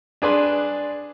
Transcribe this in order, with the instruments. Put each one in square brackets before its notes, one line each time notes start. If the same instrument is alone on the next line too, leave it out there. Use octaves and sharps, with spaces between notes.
[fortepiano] D4 G#4 B4 D5 G#5 C6